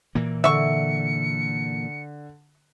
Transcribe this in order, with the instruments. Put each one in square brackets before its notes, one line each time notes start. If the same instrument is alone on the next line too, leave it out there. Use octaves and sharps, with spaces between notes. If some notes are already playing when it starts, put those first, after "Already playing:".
[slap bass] A#2 E3 A#3
[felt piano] D3 [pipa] E5 C#6 [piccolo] C#7